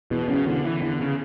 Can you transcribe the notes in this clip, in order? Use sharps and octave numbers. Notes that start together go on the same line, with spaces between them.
E2 B2
F#2 C#3
E2 D3
E3
E2 D3
C#3